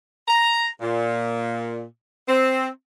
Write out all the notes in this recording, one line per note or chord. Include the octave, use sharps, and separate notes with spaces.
A#5
A#2
C4